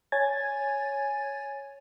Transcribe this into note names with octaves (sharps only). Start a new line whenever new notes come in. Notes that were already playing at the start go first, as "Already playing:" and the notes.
C#5 G#5 G#6 A6